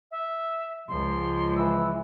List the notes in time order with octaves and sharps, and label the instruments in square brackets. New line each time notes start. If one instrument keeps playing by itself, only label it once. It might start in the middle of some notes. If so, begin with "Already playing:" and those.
[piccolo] E5
[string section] C#2 [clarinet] F3 [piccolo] C6
[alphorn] E3 [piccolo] E6